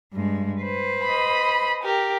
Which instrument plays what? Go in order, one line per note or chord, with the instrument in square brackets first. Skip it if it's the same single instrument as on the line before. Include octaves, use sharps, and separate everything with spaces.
[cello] G2 G#3
B4 C5
[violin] D#5 B5
G4 A#4